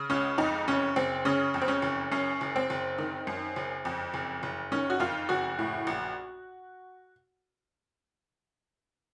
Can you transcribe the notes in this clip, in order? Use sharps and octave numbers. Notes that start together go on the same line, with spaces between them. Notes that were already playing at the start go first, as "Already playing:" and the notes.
Already playing: C#3
C#2 C#4
F2 D#4
F#1 C#4
F#1 C4
C#3 C#4
F2
C4
C#4
F#1
F#2 C#4
F#1
C4
F#1
D#3
F#2
F#1
F2
F#1
F#1
D#3 C#4
F#4
F2 F4
F#1 F#4
A2
A#1